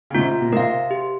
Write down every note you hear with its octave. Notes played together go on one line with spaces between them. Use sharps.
C#3
G#2 C3 F4
A#2
G#2 C3 A#4 F5
G4